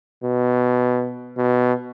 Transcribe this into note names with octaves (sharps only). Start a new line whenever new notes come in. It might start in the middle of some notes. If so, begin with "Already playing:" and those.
B2
B2